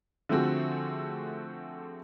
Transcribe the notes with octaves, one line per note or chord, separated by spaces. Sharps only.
D3 F3 A3 C4 F#4 G#4